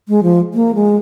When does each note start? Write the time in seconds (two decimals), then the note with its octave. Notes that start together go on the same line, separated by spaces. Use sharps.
0.08 G#3
0.23 F3
0.54 A#3
0.75 G#3